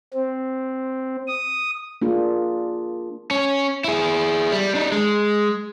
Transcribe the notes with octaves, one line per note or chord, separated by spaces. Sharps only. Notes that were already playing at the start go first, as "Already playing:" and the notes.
C4
D#6
A#3 D4 F4 G#4
C#4
E4 G#4
G3
D4 D#4
G#3